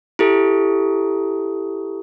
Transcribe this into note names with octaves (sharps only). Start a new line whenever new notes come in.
E4 G4 A4